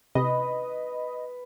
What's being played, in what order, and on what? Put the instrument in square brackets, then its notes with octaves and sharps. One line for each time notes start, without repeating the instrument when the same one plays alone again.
[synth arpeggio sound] C3 [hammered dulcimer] B4 [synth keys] D#5